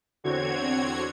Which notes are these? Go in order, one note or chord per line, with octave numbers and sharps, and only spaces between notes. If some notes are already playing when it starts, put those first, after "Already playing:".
E2 D3 C4 F#4 C#5 G#6